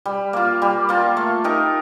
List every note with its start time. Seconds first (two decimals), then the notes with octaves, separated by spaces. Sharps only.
0.06 G3
0.33 A#3 F4
0.62 G3
0.89 A#3 F4
1.17 A3
1.44 D#4 G4 A#4